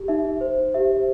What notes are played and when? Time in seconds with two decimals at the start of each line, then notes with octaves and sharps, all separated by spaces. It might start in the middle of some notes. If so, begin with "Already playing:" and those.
Already playing: G4
0.08 D#4 E5
0.25 D#4
0.41 C5
0.58 D#4
0.74 G4 E5
0.91 C5